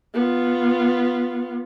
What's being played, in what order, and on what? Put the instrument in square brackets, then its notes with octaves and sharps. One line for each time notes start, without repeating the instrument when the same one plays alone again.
[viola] B3 F4